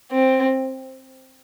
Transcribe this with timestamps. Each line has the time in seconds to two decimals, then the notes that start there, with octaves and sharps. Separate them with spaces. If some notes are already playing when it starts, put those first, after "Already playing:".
0.12 C4